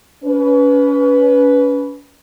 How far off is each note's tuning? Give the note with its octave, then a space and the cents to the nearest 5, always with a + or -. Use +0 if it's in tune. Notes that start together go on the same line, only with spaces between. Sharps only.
C#4 +35 B4 +0